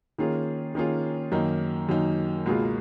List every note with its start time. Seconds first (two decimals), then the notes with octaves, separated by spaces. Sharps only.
0.18 D#3 A#3 C#4 F4 G#4
0.75 D#3 A#3 C#4 F4 G#4
1.32 F#2 D#3 A#3 D#4
1.89 F#2 D#3 A#3 D#4
2.46 C#2 B2 A#3 F4 G#4